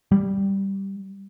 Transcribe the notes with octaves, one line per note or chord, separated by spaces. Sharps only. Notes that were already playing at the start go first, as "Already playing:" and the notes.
G3